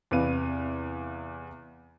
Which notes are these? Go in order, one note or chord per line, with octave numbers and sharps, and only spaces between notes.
E2 C3 B4 F5 D#7